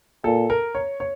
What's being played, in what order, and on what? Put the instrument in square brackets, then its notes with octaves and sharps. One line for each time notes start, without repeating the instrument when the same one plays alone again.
[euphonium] A#2 [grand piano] A4
[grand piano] A#4
C#5
C#5